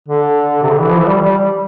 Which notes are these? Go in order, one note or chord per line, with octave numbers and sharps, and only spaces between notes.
D3
C3
D3
E3
F3
E3
G3
G3